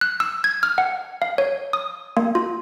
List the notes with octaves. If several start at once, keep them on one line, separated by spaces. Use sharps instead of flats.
F#6
E6
G#6
F6
F#5
F5
C#5
D#6
A#3
F4